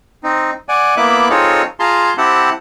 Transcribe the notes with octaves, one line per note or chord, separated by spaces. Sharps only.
C4 D#4
D5 F#5 G#5
A#3 B3 E4 E5 D6 F#6
C4 D#4 F4 G#4 A4 C#5
F4 G#4 A5 A#5 C6
C4 E4 G4 F#5 A5